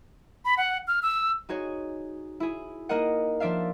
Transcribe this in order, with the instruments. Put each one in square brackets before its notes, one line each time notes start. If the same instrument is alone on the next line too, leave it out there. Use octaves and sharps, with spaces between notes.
[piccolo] B5
F#5
F6
E6
[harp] D#4 F#4 G#4 C#5
E4 G#4
A#3 D#4 A#4 D#5 F#5
F3 D4 D5 E5 F5